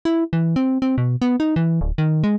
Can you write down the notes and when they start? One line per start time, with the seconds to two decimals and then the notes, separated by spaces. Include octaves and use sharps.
0.05 E4
0.33 E3
0.56 C4
0.82 C4
0.98 B2
1.22 B3
1.40 D#4
1.56 E3
1.81 D1
1.98 D#3
2.24 G#3